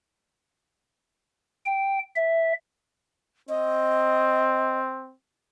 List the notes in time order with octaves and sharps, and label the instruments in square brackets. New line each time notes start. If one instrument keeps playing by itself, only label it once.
[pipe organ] G5
E5
[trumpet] C4 [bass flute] D#5